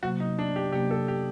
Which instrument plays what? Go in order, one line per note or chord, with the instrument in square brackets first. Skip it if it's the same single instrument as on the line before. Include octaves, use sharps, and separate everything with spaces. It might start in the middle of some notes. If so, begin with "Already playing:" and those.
[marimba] C3 F#3 A#3 [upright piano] F#4
[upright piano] D#4
D4
G4
[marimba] C3 F#3 A#3 [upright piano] G4
[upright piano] A4
G4